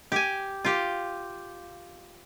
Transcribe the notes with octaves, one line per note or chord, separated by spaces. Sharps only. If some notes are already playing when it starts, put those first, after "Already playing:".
G4 G#5
F4 G4